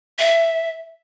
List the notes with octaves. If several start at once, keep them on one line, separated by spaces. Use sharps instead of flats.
E5